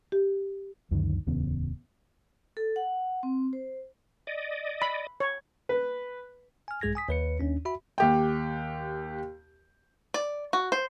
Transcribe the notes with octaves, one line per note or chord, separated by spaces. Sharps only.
G4
C#2 F#2 D3 D#3
D1 E2 C#3 B3
A4
F#5
C4
C5
D5 D#5
B5
C#5
B4
G#5 F6
A#1 G2 G#3 G#4 G#6 A#6
G#5 D#6 B6
D#2 B4 C#7
D#2 C#4 D4
F#4 E5 B5
D#2 G4 G5
D5
F#4
C5